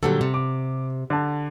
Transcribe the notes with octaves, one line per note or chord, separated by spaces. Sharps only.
A#2 D3 F#3 G3 A4
C3
D6
D3 A5